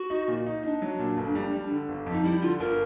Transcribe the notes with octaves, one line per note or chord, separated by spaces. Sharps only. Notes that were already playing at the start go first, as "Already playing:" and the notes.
Already playing: F#4
D#4
A#2
D#4
D4 D#4
F#3
A#2
G1
G3
G3
D3
G1
F2
D#4
G3 E4
D3 F4
G1 A#4